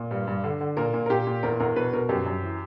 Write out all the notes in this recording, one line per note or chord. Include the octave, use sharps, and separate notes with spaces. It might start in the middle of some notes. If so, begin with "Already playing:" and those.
Already playing: A#2
G2
G2
D3
D3
A#2 A#4
A#2
A#4
A#2 G4
A#2
E2 A#4
E2 A#4
B2 B4
B2 A#4
F#2 G4
F#2
E3